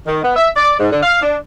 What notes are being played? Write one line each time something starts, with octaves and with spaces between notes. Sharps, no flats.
D#3
B3
E5
D5
G#2
D3
F5
D4